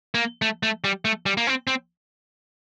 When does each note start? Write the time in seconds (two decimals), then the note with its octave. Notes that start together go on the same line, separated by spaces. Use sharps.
0.15 A#3
0.42 A3
0.63 A3
0.84 G3
1.05 A3
1.26 G3
1.37 A#3
1.47 C4
1.67 C4